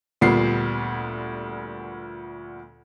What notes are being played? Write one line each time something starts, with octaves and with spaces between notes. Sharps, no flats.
D2 A#2 G3 B3 C7